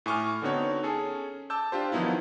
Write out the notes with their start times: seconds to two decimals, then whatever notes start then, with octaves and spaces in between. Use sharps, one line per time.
0.06 A2 G#5 C#6 D6 F6
0.42 D3 B3 C4 D#4 F#4 C#5
0.83 C#4 G#4 A4
1.50 A5 D6 E6 G6
1.72 D4 F4 G4 C5
1.92 D#3 F3 F#3 B3 D#4 E4